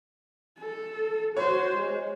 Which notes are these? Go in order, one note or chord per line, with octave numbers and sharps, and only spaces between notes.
A4
F#4 C5 C#5
G#3